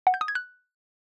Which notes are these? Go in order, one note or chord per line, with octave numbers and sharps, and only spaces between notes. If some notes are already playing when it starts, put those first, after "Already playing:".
F#5
G6
D#6
G#6
F#6